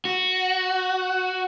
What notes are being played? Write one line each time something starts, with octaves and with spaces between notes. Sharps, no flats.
F#4